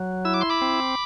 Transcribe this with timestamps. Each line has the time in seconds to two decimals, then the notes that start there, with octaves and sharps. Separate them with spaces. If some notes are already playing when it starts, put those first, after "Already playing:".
Already playing: F#3
0.25 E4 E6
0.34 D6
0.41 C6
0.50 B5 D6
0.62 C4